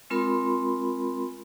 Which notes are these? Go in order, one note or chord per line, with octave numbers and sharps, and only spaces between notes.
G#3 C4 F4 A#4 B5 C6